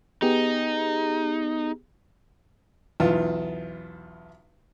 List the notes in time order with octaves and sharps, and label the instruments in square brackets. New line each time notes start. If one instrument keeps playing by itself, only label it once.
[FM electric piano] B3 G4 G#4 [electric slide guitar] D#4
[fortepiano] B1 E2 F4